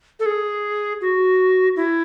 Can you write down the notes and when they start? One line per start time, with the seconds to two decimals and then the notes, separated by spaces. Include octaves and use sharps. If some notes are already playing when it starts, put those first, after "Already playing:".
0.20 A4
0.26 G#4
1.01 F#4
1.76 E4